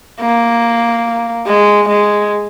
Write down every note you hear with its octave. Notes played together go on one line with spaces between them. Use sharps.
A#3
G#3
G#3